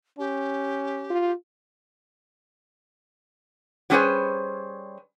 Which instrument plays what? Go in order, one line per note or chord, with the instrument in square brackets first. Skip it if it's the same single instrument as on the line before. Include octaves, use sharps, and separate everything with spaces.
[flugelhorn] C#4 [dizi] G4
[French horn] F4
[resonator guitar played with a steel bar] F#3 G3 C#4 G#4 B4 C5